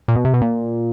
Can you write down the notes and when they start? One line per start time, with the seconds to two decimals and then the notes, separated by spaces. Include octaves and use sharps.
0.08 A#2
0.16 B2
0.25 C3
0.34 B2
0.42 A#2